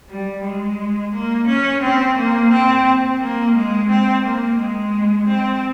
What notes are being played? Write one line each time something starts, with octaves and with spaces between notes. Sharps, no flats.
G3
G#3
A#3
C#4
C4
A#3
C4
A#3
G#3
C4
A#3
G#3
C4